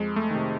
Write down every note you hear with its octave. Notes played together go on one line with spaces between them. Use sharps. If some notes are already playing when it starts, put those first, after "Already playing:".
Already playing: F2 G#3
A3
C3 D#3